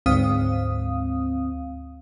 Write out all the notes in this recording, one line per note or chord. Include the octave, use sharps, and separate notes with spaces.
D2 G#2 C4 F5 D#6